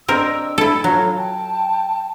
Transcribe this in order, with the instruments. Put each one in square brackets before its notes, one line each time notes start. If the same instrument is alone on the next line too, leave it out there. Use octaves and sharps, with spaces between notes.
[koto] C4 A#4 [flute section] D4 D#5 E6
[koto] E4 A4
[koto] F#3 [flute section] F4 A4 C#5
[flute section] G5 A5